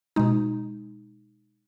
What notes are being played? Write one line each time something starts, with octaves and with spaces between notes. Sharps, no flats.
B2 G#3 D#4